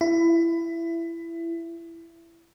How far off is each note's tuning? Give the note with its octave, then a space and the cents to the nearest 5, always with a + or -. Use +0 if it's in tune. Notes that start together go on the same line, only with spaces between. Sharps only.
E4 +20